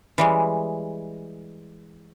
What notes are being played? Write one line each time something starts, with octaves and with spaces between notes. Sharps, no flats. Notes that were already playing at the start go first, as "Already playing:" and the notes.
E3 G3 G#3